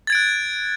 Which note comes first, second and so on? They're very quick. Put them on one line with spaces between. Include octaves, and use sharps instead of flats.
A6 G#6 D7 F#6